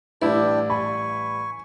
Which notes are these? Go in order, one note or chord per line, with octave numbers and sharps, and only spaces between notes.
A1 G3 D4 E4 D5 G5
G#5 B5 C#6